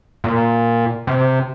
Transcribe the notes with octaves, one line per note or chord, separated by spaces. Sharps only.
A#2
C3